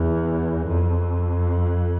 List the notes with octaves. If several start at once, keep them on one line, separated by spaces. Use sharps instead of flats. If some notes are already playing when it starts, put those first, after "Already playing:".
Already playing: E2
F2